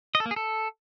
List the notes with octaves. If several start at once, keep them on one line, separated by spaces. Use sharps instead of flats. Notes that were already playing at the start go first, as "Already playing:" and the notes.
D#5
A4
A#3
G#4
A4